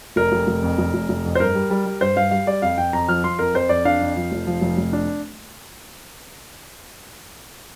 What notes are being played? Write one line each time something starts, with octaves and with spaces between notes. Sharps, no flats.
F1 A#4
F1
F1
F2
F1
F1
F1
F2
C5
G2 A#4
G3
G3
G3
G2 C5
G2 F5
G3 F5
G3 D5
F2 F5
F2 G5
F2 A#5
F3 F6
F3 C6
F2 A#4
F2 C5
F2 D5
D4 F5
F2
F3
F1
F3
F1
F1
D4